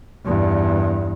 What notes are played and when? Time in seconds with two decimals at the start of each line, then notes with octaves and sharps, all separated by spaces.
0.25 E2 G2